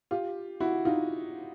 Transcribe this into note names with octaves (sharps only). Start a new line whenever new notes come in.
F4 G4
E4 F#4
D#4 F4